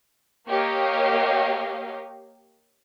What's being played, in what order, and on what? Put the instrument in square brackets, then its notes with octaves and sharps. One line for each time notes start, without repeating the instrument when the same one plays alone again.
[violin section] A#3 G4 C#5 D#5 F5